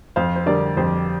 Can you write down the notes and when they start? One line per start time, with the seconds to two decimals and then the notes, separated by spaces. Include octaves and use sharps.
0.16 F2 C5 F5
0.36 C5
0.46 D3 G3 A#4 D5
0.77 F2 G4 C5